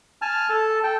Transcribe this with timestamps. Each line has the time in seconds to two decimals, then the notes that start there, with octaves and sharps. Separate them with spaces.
0.22 G#5 A5 F6
0.49 A4 A5
0.84 A4 G5